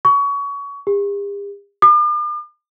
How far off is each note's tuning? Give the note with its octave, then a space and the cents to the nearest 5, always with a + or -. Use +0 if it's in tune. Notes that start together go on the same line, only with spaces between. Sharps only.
C#6 +25
G4 +45
D6 +45